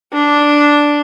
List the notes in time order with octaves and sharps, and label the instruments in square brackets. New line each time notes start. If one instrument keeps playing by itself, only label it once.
[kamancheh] D4